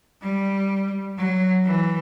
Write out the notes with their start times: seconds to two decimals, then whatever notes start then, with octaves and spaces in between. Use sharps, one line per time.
0.22 G3
1.18 F#3
1.65 E3